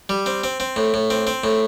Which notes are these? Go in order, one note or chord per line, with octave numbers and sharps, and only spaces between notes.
G3
C4
C4
C4
A2
A2
C4
C4
A2